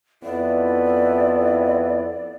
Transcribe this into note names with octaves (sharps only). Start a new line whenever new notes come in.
F2 B3 E4 D5